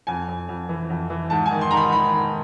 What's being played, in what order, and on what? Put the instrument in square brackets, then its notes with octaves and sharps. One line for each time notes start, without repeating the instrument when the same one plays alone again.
[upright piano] F2 G#5
F2
F2
E3
F2
E3
G#2 A5
G#5
D#3
C6
G#2 A#5
B5
D#3 B5
D#3